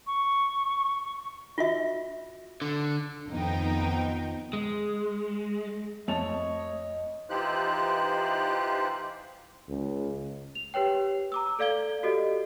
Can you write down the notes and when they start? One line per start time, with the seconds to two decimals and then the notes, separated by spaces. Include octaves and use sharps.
0.06 C#6
1.58 F4 F#4 E5
2.62 D3
3.29 F2 D#3 F3 B3 D#4 G5
4.53 G#3
6.08 F2 A3 C#5 D#5 A5 F7
7.30 E3 D#4 F4 G4 C5 F#6
9.68 C#2
10.55 F7
10.74 G4 B4 C#5 G5
11.32 A#5 D6 E6
11.59 A4 D5 F5 G#6 G7
12.03 F#4 G4 A4 D#5